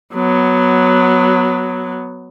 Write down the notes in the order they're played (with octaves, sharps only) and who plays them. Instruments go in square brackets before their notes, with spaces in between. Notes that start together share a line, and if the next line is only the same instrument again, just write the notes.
[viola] F#3 B3